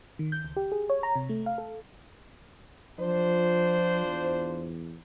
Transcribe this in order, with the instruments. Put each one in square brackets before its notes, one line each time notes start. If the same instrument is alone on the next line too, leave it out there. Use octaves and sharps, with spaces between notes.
[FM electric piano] D#3
G6
C#2
G4
G#4
C#5
A#5
C3
A3
F5
A4
[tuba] F3 [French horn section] D4 F4 C5
[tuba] E2